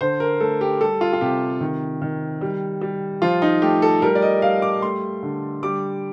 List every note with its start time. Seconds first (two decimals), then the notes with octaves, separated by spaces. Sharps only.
0.01 D3 C5
0.20 A#4
0.40 A3 A4
0.61 G4
0.81 G3 A4
1.01 F4
1.13 F4
1.21 C3 G4
1.61 D#3
2.02 D#3
2.41 G3
2.81 G3
3.22 F3 F4
3.42 D#4
3.62 A3 G4
3.82 A4
4.02 G3 A#4
4.15 D5
4.22 D#5
4.42 G3 F5
4.62 D6
4.82 A3 C6
5.23 D3
5.63 G3 D6